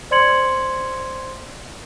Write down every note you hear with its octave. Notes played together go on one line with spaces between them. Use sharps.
C5 D5 C6 G#6 C#7 F#7